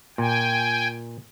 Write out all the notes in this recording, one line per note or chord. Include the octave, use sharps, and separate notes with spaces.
A#2 G5 G#5